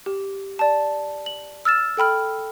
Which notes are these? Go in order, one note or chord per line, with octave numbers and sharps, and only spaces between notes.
G4
D5 A5
F#7
E6 F6 A6 E7
A4 G5 B5 F6